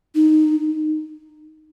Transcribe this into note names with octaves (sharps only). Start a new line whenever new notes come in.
D#4